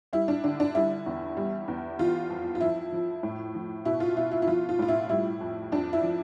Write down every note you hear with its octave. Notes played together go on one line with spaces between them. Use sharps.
G3 E4
D4
D3 D4
D4
G3 E4
E2
G3
E2
E3 F4
F2
F4
F3 E4
F3
A2
F3
B2 E4
F4
B2 E4
E4
E4
F3 F4
F4
A2 F4
E4
G3 E4
F2
F2 D4
E4
F3